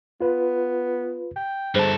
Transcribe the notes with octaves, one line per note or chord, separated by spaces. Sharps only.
B3 F4 B4
G5
G2 G#4 A4 C5